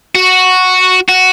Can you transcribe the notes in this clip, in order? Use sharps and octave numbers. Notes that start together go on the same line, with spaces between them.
F#4
F#4